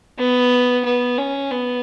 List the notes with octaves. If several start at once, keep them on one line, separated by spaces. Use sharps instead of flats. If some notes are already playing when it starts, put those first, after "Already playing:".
B3
B3
C#4
B3